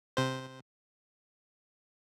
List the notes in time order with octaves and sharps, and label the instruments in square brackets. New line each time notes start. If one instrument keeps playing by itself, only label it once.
[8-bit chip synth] C3 C5